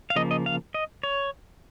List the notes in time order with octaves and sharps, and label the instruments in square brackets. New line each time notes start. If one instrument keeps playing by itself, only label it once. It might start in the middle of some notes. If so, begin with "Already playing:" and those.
[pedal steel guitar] F5
C#3 F3 A#3 D#5
D#5
F5
D#5
C#5